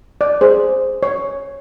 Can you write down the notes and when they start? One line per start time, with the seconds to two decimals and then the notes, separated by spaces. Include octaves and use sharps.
0.21 D5
0.41 G#4 C5
1.03 C#5